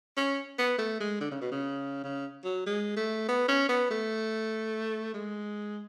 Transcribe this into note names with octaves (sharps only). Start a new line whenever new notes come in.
C#4
B3
A3
G#3
D3
C#3
B2
C#3
C#3
F#3
G#3
A3
B3
C#4
B3
A3
G#3